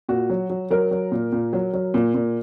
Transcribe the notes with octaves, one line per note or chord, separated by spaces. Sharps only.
A#2 F#4
F#3
F#3
F#3 A#4
F#3
A#2
A#2
F#3
F#3
A#2
A#2